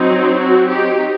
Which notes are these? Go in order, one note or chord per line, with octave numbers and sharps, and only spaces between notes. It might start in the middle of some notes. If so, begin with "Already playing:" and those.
Already playing: F#3 C4 D#4
F#4
D#4 G4